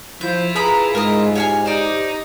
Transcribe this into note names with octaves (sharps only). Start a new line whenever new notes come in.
F3 E4 F4 G6
G#4 B4 A#5 B5 D#6
G#2 G#3 A#4 D#6
G4 C#5 F5 G#5
D#4 C5 D5